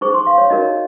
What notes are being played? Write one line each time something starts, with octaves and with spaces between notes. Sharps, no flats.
D#4 G#4 C5 C#6
C6
F5
C#5
D#4 F#4 A#4 C#5 D#5